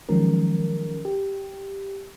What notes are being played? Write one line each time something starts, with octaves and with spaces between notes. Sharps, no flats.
D#3 F3 F#3 G#3 C#4 A#4
G4